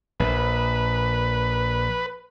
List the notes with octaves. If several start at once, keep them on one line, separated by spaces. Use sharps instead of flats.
A#1 B4